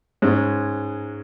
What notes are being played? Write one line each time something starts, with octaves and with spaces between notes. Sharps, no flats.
G#2 G#3 C#4